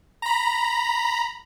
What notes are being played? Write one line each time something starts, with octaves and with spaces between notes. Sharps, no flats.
A#5 B5